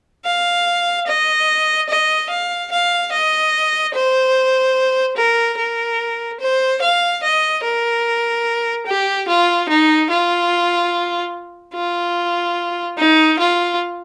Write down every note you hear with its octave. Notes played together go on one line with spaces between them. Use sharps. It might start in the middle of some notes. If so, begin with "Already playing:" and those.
F5
D#5
D#5
F5
F5
D#5
C5
A#4
A#4
C5
F5
D#5
A#4
G4
F4
D#4
F4
F4
D#4
F4